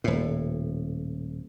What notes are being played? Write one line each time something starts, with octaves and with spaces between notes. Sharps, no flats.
D#1 A2